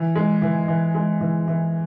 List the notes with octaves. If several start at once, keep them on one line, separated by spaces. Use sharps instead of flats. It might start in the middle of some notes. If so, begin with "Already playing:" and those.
Already playing: E3
G#3
E3
E3
G#3
E3
E3